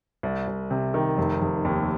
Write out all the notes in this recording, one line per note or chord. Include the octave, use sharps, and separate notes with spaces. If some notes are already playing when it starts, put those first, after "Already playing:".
C2
C2
C3
D#3
F1
F1
D#2